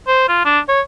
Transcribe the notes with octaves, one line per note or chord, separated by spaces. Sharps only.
C5
F4
D4
C#5